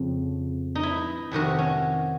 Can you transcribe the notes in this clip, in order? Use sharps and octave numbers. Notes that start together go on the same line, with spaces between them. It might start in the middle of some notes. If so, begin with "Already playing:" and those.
Already playing: F2 C#3
D#4
E4
F2 C3 D#3 F#4
C#4